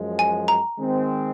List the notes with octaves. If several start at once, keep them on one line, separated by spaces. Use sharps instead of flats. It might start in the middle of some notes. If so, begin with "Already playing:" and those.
Already playing: F#2 F3 G#3
G#5
A#5
D#3 G#3 C4